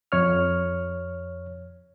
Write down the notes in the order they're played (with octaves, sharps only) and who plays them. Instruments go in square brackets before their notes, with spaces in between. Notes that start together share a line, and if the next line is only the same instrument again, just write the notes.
[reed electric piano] F2 C#5 F6